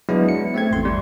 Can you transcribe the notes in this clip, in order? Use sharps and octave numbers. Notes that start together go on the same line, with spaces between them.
F#3 G#3 B3 D4 E4
C#7
A3 C4 G#6
G#1 E2 C6
G3